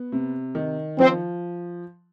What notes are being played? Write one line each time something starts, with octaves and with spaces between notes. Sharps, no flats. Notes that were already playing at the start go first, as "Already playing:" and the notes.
Already playing: B3
C3
D#3
F3 C4